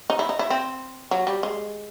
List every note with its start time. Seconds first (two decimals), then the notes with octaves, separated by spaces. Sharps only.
0.10 D#4
0.19 E4
0.29 D#4
0.39 E4
0.50 C4
1.11 F#3
1.27 G3
1.43 G#3